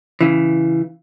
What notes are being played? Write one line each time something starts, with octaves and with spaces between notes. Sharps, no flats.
C#3 E3